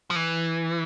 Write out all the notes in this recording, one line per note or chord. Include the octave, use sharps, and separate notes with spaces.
F3
E3